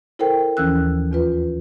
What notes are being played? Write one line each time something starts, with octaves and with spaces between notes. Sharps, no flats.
E4 A4 A#4 C5 G5
D#2 E3 F3 C#4 E6 F#6
E2 F4 B4